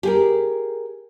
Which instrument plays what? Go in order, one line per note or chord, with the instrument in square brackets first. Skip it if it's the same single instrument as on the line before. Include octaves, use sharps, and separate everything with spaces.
[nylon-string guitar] G4 G#4 A#4